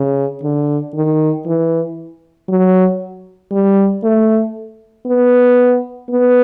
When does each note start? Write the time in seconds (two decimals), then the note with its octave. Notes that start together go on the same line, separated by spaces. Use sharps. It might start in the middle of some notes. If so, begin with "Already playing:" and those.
Already playing: C#3
0.42 D3
0.94 D#3
1.46 E3
2.49 F#3
3.52 G3
4.03 A3
5.06 B3
6.10 B3